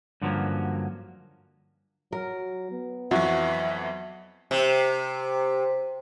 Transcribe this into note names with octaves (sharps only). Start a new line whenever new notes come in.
G2 D3 F3 F#3 A#3 C#4
F#3 A#4
B3
F2 E3 F#3 F#4 E5
C3